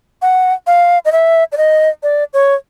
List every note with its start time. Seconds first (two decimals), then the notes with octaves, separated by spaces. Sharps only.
0.22 F#5
0.67 F5
1.05 D#5
1.12 E5
1.52 D5
1.57 D#5
2.03 D5
2.33 C#5